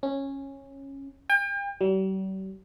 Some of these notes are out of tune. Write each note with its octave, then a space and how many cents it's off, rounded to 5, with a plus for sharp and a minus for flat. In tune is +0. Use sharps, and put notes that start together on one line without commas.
C#4 -15
G5 +40
G3 -45